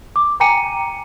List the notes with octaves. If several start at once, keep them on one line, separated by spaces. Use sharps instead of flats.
D6
G5 G#5 A#5 D6 C#7 D#7